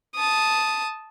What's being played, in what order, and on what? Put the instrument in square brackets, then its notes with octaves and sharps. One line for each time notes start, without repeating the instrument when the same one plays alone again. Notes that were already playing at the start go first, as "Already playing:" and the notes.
[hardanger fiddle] A5 D#6